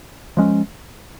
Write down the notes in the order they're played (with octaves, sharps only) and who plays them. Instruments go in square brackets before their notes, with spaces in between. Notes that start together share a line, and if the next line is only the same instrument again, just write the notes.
[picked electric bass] F3 G#3 C#4